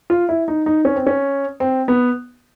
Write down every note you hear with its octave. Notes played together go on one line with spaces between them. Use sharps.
F4
E4
D#4
D#4
C#4
C4
C#4
C4
B3